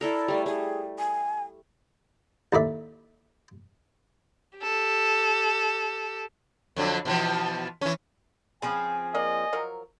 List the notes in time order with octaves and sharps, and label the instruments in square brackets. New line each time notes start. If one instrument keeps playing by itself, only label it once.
[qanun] E4 A4 A#4 [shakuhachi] D5
[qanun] G3 A3
[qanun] G3 [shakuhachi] G#4
[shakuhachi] G#5
[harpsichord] D#2 A2 D5 E5
[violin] G4 A4
[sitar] F2 D3 F#3
B2 E3 F3
E3 C#4
[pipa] C#3 B5 [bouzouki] F3 C4 G#4 [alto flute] G#5
[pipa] A#3 D5 [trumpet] D#5
[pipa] F3 F#3 A#4